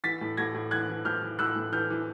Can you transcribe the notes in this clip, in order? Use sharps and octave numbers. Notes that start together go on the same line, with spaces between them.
E3 A6 B6
A2
A2 G#6 A#6
A2
E3 F#6 G#6
E3
A2 F6 G6
E3
A2 E6 F#6
A2
E3 F6 G6
E3